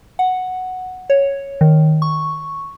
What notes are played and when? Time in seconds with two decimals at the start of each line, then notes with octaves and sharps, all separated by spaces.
0.19 F#5
1.10 C#5
1.61 D#3
2.02 C#6